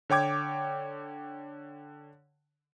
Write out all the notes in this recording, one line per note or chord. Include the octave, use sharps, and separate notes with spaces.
D3 C#5 G5 D6 G#6